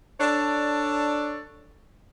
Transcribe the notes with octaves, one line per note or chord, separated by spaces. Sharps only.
D4 A4 C#5 D5